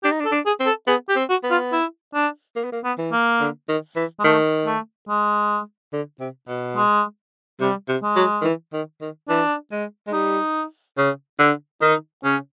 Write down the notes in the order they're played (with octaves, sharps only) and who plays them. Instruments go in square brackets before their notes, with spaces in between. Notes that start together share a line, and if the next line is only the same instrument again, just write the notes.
[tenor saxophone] D4 [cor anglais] G4
[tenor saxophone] D#4
D4
[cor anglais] A4
[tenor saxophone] D4
[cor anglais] G#4
[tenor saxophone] C4
[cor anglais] A4
[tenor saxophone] B3 [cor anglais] G#4
[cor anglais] G4
[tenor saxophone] C4
[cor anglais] F#4
[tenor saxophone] B3
[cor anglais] F4
E4
D4
[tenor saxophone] A#3
B3
A#3
[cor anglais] B3
[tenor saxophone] E3
[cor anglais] A#3
[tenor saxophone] D3
D#3
E3
[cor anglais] G#3
[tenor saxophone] D#3 [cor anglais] A3
[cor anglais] A3
G#3
[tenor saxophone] D3
C3
B2
[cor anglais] G#3
[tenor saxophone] C3 [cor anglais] G3
[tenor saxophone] C3
[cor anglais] G#3
[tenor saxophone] F#3
D#3
E3
D#3
D#3
[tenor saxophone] E3 [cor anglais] D4
[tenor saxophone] G#3
G#3
[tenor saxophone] G3 [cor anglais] D#4
[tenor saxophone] C#3
D3
[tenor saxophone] D#3 [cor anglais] D#4
[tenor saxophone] C#3 [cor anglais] C#4